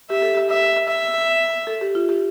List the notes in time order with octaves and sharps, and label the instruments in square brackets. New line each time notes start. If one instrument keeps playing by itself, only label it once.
[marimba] G4 [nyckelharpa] E5
[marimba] A4
G4
[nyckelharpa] E5
E5
[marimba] A4
G4
F4
G4